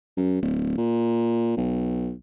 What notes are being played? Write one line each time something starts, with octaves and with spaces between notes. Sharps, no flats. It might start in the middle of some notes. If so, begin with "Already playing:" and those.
F#2
D1
A#2
B1